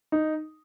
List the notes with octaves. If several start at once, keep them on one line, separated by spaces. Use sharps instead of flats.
D#4